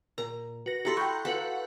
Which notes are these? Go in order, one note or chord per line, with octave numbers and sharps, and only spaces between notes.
A#2 A#4 A#5
F#4 B4 A#6
E4 F#4 G4 A4 A#5 C6
G5 B5 C#6 F#6 G6
F#4 A4 B4 F5 F#5